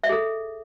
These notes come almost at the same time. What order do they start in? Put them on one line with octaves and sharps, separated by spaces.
E5 D#5 G#4 A4